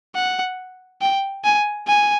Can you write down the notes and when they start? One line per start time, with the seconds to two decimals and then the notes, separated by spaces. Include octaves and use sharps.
0.15 F#5
1.01 G5
1.44 G#5
1.87 G#5